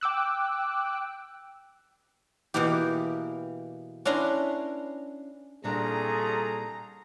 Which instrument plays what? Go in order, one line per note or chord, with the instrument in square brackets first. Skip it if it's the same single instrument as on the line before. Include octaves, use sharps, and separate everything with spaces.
[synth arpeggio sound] G5 D6 E6 F#6
[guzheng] B2 E3 A#3 E4 G4
C#4 D4 E4 B4 A#5 C6
[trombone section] C2 G#4 A4 [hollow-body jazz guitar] A#2 G3 D4 [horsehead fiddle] A#5